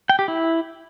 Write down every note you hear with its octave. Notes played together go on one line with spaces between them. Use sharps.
G5
G4
E4